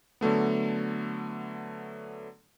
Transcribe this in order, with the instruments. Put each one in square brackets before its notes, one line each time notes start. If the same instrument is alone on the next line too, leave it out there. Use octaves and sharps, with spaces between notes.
[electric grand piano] D3 F#3 A3 B3